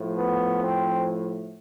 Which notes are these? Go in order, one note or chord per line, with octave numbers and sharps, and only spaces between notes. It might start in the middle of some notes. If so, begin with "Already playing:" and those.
Already playing: A2 F3
B3
C4